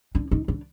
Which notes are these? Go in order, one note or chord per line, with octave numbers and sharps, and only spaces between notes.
D4
D#4
D4